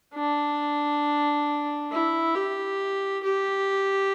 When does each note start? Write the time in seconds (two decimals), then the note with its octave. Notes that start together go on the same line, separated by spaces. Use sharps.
0.15 D4
1.91 E4
2.35 G4
3.24 G4